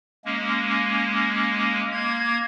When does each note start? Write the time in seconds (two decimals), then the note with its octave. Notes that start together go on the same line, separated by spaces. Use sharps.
0.25 G#3 A#3 C#4
1.92 A#3 G#6